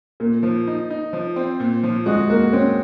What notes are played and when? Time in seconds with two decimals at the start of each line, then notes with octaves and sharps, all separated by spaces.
0.20 A#2 A#3
0.43 F3
0.67 D#4
0.90 D#4
1.13 F3
1.36 C4
1.60 A#2
1.83 F3
2.06 G#3 F#4
2.30 A#3 F#4
2.52 C4 C#4